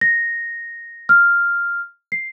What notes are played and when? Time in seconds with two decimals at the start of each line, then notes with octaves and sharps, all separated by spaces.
0.01 A#6
1.09 F6
2.12 C7